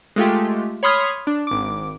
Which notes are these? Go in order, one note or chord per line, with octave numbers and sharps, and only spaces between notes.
G#3 A3 F4 G4
C#5 B5 C6 D#6 F6 G#6
D4
G#1 D6